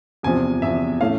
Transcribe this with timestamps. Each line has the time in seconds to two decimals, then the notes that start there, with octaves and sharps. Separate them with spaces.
0.23 E2 C3 F3 G#5
0.62 E2 C3 F3 E5
1.00 A2 E3 A3 C#4 F5